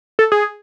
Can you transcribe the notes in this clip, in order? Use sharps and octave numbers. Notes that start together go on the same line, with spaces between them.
A4
G#4